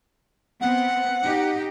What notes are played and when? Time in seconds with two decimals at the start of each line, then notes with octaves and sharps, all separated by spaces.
0.60 B3 C4 F#5
1.24 D#4 G4